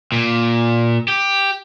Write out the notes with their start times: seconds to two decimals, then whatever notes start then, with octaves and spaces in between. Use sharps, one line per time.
0.12 A#2
1.08 G4